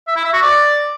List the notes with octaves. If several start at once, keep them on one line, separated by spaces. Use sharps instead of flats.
E5
E4
E5
F#4
D5